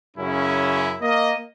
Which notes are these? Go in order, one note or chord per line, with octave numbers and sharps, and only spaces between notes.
F#2 C#3 C#4 E4
A#3 D#5